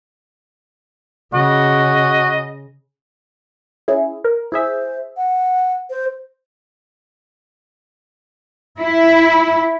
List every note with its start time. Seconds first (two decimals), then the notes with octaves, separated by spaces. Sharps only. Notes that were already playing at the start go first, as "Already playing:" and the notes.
1.34 C#3 F#4 D#5
3.88 C#4 E4 G#4
4.24 A#4
4.52 E4 G#4 C5 E5
5.17 F#5
5.90 C5
8.81 E4